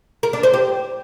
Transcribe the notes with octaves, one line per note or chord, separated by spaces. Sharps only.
A#4
D4
C5
G4